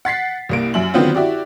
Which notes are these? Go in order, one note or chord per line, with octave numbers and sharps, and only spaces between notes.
F#5 A6 B6 C7
C2 A#3 D7
F#2 E5 F#7
D3 D#3 F#3 B3 C4 F4
E4 F#4 G4 D5